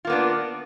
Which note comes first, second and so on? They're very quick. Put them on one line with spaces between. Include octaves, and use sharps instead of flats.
F4 A#3 B3 D4